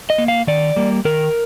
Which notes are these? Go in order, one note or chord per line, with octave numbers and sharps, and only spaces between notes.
D#5
A#3
F5
D#3 D5
G3 A#3
D#3 A#4